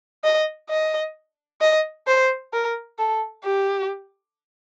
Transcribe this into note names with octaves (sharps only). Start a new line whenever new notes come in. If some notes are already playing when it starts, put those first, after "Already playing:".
D#5
D#5
D#5
C5
A#4
A4
G4